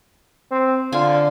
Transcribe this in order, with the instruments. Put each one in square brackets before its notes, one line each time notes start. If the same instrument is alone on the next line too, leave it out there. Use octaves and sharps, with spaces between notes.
[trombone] C4
[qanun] D3 G#5 [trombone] F4